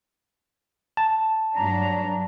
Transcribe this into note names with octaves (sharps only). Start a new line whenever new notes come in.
A5
G2 F#3 D4 A#5